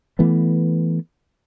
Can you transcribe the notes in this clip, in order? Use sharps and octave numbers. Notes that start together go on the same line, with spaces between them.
E3 A3 B3